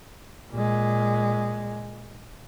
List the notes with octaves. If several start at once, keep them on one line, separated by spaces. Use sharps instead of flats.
A#2 G#3